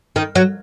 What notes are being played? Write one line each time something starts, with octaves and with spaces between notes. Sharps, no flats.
D#3
F#3